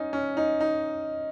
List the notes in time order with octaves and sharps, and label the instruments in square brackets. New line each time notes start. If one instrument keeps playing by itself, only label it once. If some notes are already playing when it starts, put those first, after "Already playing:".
Already playing: [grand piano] C#4 D#4
C#4
D#4
D#4